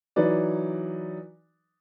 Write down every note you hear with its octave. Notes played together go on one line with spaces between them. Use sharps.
E3 F#3 D#4 B4 D5